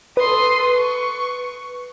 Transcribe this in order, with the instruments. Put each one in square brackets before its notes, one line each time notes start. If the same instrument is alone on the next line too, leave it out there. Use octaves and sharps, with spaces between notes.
[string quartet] A4 C6 D#6 [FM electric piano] B4
[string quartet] C#6